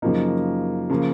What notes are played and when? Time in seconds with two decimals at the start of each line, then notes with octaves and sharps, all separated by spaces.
0.02 F#2 C#3 F3 A#3 D#4
0.90 C#3 F3 A#3